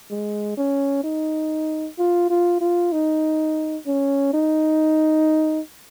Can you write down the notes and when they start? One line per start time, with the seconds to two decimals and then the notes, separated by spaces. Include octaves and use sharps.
0.11 G#3
0.57 C#4
1.04 D#4
1.98 F4
2.30 F4
2.61 F4
2.92 D#4
3.86 C#4
4.33 D#4